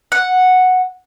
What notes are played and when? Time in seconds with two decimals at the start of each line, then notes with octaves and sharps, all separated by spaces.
0.12 F#5